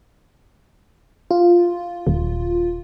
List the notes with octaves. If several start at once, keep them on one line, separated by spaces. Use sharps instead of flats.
F4
D#1